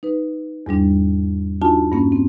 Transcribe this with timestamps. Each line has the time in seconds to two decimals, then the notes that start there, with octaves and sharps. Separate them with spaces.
0.03 D#4 B4
0.66 E2 G#2 G3 D4
1.62 D4 D#4 F4 F#4 G#5 A5
1.92 G2 A#3 C#4
2.12 C4